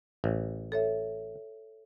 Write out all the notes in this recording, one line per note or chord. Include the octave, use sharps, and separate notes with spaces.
A1
A4 C#5 E5